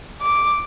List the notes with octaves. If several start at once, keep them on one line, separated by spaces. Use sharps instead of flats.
D6